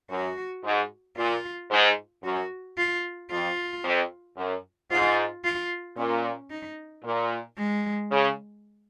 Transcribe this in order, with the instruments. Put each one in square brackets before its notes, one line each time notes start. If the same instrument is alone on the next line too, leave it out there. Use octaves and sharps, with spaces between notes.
[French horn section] F#2 [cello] F#4
[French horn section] G#2
[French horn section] A#2 [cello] F4
[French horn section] G#2
[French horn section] F#2 [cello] F#4
[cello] F4
[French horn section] F2 [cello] F4
[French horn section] F2
F#2
[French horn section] G#2 [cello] F4
[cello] F4
[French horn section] A#2 [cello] C#4
[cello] D#4
[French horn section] A#2
[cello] G#3
[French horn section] C#3